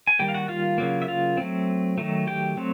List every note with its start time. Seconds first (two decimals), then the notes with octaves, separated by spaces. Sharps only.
0.07 G#5
0.19 D#3 G3 A#3 G4 G5
0.28 F5
0.34 F#4 F#5
0.48 F4 F5
0.78 C#3 F#3 A#3
1.02 E5
1.08 F4 F5
1.37 F#3 A3 C4
1.98 D#3 F#3 A3
2.27 G4 G5
2.57 F#3 A3 C4